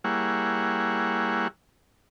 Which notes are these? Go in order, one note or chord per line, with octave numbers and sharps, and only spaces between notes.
G3 A#3 E4 G#4 C#5 F#5